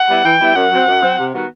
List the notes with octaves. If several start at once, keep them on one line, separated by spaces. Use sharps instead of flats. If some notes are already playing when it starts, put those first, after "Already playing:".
Already playing: F#5
G3 B3 E4
E3 G5
G3 B3 E4
F#2 F#5
F#3 C4
F#2
F#3 C4
C3
D#3 G3 B3 F#4